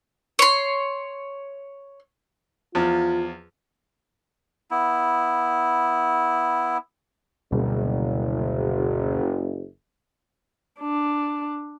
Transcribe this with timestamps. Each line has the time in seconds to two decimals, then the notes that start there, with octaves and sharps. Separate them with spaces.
0.39 C#5 C6
2.75 E2 F3 F4
4.71 B3 E4
7.52 F#1 D2 B2 G3
10.80 D4